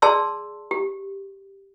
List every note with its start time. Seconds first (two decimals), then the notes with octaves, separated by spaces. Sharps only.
0.02 G#4 D5 A5 C6 E6
0.71 G4